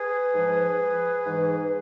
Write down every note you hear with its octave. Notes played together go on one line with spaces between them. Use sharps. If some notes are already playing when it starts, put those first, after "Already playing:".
Already playing: G#4 B4
G#2 F3
G#2 E3